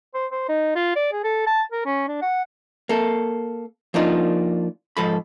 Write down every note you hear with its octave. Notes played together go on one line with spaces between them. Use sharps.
C5
C5
D#4
F4
D5
G#4
A4
A5
A#4
C#4
D4
F#5
A#3 A4
F3 A#3 D4 D#4 F4
G#2 F3 A4 B5